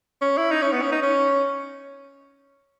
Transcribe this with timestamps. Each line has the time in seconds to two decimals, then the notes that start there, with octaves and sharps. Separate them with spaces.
0.21 C#4
0.37 E4
0.52 D#4
0.62 C#4
0.72 B3
0.82 C#4
0.92 D#4
1.02 C#4